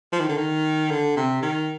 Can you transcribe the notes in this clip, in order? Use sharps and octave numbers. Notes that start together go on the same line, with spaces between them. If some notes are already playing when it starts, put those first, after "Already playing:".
F3
D#3
D3
D#3
D3
C3
D#3